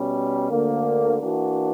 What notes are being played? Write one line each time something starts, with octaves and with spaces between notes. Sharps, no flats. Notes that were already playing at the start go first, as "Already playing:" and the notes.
Already playing: B2 G3 C#4
D2 D3 A#3
E3 A#3 D4 F#4